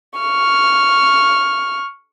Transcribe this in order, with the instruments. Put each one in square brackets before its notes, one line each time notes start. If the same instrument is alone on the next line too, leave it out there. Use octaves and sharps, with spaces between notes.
[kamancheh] C#6 F6